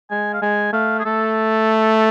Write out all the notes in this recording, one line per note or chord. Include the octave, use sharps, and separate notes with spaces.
G#3 G#5
F5
G#3 G#5
A3 F5
G#4
A3 A4